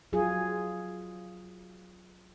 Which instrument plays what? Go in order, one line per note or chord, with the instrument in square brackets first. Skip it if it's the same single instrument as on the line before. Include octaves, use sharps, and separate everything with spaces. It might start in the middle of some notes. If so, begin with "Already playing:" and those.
[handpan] F#3 F4 G#4